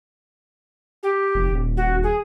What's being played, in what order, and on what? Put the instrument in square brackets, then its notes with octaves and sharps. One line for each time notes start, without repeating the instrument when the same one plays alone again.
[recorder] G4
[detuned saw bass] F1
D#1
[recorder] F#4
G#4